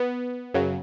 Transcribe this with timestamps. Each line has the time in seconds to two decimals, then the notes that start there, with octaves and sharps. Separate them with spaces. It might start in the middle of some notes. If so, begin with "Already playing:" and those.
Already playing: B3
0.54 F#2 C#3 F#3